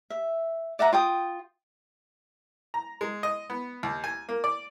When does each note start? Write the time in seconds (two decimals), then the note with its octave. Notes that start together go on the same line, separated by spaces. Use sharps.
0.10 E5
0.79 D5 E5 F#5 A#5
0.93 F4 G5 D#6
2.74 A#5
3.01 G#3
3.23 D#5
3.50 B3
3.83 D#2
4.04 G#5
4.29 A#3
4.44 D5